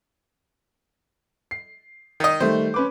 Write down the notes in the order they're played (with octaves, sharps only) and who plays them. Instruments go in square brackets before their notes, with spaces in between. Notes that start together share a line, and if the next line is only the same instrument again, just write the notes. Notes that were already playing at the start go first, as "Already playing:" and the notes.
[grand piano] C7
[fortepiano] D#3 D#5
[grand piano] D#3 G3 A3 [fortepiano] C5
[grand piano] C#4 B4 D6